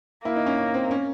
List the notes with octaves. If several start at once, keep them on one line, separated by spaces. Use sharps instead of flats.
A#3 E4
D#4
C#4
C#4
C4
C#4